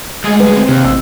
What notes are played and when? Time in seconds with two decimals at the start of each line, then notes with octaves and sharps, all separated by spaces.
0.25 D2 G#3 G#4
0.40 G3 B4
0.55 C4
0.68 D#2 C3
0.85 A1 E6